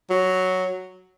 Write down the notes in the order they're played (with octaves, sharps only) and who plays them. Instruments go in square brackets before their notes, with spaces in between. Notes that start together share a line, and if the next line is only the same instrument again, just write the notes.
[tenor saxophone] F#3